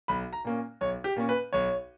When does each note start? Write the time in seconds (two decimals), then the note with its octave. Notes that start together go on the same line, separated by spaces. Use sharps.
0.08 B1 B5
0.33 A#5
0.45 A#2 A#3 C#4
0.81 B1 C#5
1.04 G4
1.16 A#2 A#3 C#4
1.29 B4
1.53 B1 C#5